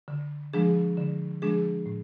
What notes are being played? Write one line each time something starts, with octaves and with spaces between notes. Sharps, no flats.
D3
F3 G#3 D4 G#4
D3
F3 G#3 D4 G#4
A2